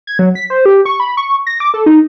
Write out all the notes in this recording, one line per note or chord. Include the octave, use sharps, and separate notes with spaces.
G#6
F#3
B6
C5
G4
C#6
B5
C#6
A#6
D6
A4
D#4